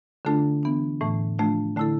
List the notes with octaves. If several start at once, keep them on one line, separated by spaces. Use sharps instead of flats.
D3 A3 D4 F4 A4
E3 B3 D4
A2 E3 A3
F3 A3 D4 F4
D3 A3 E4 A4